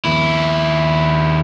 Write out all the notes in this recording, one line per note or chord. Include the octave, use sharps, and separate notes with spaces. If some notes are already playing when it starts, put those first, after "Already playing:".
D#2 E4